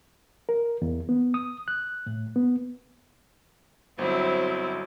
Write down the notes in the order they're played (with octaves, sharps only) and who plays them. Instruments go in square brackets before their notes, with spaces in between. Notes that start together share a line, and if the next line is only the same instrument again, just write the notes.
[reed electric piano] A#4
E2
B3
D#6
F#6
A2
B3
[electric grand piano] G1 [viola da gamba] F#3 [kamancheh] C4 E4 [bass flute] C5